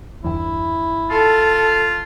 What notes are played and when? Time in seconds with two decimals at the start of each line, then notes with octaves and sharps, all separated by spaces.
0.24 G1 E2 E4
1.10 F4 A4